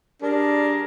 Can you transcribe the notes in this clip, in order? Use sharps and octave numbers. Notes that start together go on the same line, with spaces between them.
G3 D4 G#4 A#4